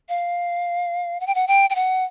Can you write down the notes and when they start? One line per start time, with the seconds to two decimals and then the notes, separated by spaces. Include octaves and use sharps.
0.09 F5
1.20 F#5
1.27 G5
1.35 F#5
1.48 G5
1.70 G5
1.75 F#5